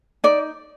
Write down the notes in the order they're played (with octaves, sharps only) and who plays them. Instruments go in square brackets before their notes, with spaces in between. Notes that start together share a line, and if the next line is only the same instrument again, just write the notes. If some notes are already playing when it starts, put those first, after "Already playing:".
[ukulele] D#4 D5